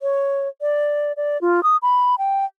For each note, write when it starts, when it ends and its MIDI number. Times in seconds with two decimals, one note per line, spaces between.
0.01 0.48 73
0.61 1.13 74
1.17 1.40 74
1.41 1.63 65
1.63 1.77 87
1.82 2.15 83
2.18 2.45 79